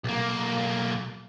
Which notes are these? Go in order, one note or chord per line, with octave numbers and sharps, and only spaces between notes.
B1 A#3